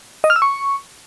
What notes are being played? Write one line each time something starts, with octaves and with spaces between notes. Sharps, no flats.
D#5
F6
E6
C#6